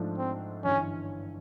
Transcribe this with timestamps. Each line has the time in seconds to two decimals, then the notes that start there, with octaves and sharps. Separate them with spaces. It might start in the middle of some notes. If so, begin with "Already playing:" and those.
Already playing: G#2 F3 A3 D4
0.18 C4
0.64 G1 G2 E3 C#4